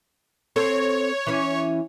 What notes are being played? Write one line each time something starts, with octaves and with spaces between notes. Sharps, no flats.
C4 A4 C5 C#5
E3 C#4